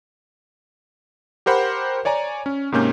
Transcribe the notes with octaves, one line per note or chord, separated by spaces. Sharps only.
G4 A#4 C5 F#5 B5
C#5 D5 G#5 A#5
C#4
G#2 C3 A#3 C#4 G6